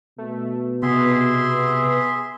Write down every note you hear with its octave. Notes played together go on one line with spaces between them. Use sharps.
B2 A3
C3 B3 G#4 E5 C6